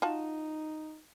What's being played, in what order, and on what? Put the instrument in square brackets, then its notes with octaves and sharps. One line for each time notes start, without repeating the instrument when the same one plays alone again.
[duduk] D#4 [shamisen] F4 F#4 A5